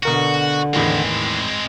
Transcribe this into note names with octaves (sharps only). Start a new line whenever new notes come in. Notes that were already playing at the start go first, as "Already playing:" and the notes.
B2 D3 F#4 A#4 C#7
E2 A2 D#3 G#3 C4